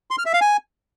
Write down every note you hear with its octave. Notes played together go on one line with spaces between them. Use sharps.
C6
F6
E5
F5
G#5